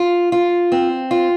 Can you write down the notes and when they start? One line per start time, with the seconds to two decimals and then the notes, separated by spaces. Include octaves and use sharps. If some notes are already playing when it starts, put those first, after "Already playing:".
Already playing: F4
0.32 F4
0.72 C4
1.11 F4